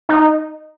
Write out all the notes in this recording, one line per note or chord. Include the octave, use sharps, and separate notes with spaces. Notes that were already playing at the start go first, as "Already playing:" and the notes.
D#4